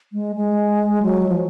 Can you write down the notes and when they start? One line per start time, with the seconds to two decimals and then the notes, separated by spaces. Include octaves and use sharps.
0.13 G#3
0.36 G#3
1.03 F#3
1.29 F3